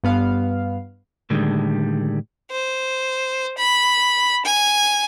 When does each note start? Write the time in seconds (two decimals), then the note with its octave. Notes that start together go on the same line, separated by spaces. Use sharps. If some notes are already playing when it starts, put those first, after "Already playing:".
0.04 G2 B3 F5
1.30 A2 D3 D#3 G3 G#3
2.51 C5
3.57 B5
4.45 G#5